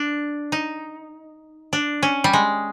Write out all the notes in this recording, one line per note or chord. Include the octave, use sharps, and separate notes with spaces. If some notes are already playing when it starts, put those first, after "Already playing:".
Already playing: D4
D#4
D4
C#4
G3
G#3